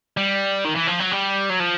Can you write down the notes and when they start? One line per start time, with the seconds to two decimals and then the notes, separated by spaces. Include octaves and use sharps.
0.17 G3
0.65 D#3
0.76 E3
0.88 F3
1.00 F#3
1.12 G3
1.50 F#3
1.60 F3